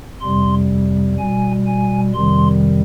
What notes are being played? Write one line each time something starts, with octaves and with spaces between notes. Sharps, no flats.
F2 C3 G3 C6
B2 G3 G#5
G#5
F2 C3 D#3 G3 C6